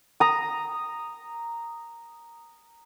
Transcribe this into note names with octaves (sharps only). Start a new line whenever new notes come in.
A#5 D#6